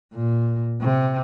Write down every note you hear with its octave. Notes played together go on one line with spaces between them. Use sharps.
A#2
C3